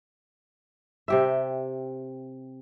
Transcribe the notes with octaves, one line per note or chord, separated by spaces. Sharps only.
C3 G4 E5